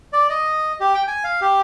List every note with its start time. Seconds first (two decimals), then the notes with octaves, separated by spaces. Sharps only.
0.13 D5
0.30 D#5
0.80 G4
0.94 G5
1.07 G#5
1.24 F5
1.41 G4